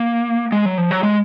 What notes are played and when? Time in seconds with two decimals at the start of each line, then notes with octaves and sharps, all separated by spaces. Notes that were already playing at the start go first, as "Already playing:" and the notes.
Already playing: A#3
0.52 G#3
0.65 F#3
0.78 F3
0.91 F#3
1.03 G#3